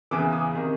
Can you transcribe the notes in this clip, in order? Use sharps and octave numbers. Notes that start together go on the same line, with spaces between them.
E2 C#3 E3 D6
D#6
C3 D#3